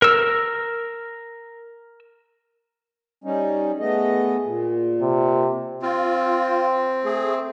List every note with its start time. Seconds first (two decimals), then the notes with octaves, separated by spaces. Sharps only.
0.02 A#4 E6
3.24 G3 C#4 D#4
3.80 A3 B3 G#4 D#5
4.45 A#2
5.02 C3
5.82 C4 F4
7.04 A3 G#4